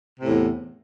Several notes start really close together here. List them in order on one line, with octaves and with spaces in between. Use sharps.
C3 A2 E2